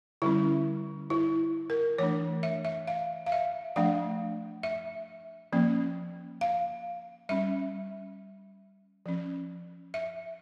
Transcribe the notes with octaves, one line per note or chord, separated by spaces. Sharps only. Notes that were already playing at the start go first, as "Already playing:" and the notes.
D3 G3 C#4 E4
E4
A#4
E3 A3 D4 C#5
E5
E5
F5
F5
E5
F3 A3 D4 F5
E5
F3 A#3 C#4
F5
G3 C#4 E5
F3 C#4
E5